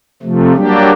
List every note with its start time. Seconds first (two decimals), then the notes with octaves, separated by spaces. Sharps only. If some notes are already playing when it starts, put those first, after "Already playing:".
0.23 C3 F3 A3
0.55 F#3 G3 A#3 D4 G4